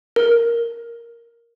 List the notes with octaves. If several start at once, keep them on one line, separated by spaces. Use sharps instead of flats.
A#4